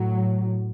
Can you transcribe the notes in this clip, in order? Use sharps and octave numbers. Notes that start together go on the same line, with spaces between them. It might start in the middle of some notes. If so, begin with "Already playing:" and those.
Already playing: A2 F#3